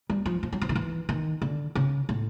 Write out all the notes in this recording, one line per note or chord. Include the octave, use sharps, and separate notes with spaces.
G3
F3
F3
F#3
F3
D#3
E3
D#3
D3
C#3
A2